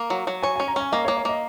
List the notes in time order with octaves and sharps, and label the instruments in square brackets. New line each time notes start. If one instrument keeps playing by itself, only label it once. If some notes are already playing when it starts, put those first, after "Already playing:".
Already playing: [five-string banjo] A#3 [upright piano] A#5
[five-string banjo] F#3
F#3
[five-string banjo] C#5 [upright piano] G#5
[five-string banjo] C#4 [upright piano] G#5
[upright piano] A#5
[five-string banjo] C#4 [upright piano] G#5
[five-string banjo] A#3 [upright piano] D#5
[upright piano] C#5
[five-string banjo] A#3
[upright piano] C#5
[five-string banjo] A#3 [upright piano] D#5